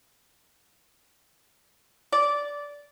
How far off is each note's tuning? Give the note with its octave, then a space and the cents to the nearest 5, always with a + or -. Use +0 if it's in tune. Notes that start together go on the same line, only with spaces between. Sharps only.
D5 -15